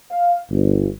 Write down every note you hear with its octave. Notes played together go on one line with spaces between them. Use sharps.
F5
G1